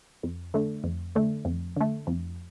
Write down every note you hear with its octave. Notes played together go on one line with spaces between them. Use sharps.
F2
D3 A3
F2
D3 A3
F2
D3 A3
F2